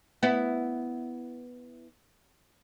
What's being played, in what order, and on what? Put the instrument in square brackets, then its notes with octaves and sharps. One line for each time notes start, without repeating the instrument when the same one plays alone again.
[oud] B3 E4